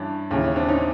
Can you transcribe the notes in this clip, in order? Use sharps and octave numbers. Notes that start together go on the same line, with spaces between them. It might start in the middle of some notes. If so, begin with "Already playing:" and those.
Already playing: G2 E3 C#4 D4
D#2 C#3 E3 C#4
C#4
C4 D4
C#4 D#4